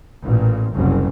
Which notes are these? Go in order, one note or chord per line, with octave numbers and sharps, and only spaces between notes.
A1 A#2
F#1 C2 F#2